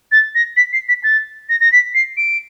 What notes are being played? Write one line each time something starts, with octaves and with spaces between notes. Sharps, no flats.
A6
A#6
B6
C7
B6
A6
A#6
A#6
B6
C7
D7